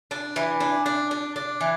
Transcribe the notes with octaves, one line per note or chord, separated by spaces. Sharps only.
D4
E3
D4
D4
D4
D4
E3